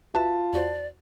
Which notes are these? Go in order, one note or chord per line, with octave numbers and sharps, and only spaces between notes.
F4 F#4 B4 E5 A5
E2 F#4 C5 D5